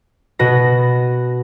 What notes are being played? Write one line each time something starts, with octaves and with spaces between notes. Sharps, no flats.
B2 B3 F#4 A#6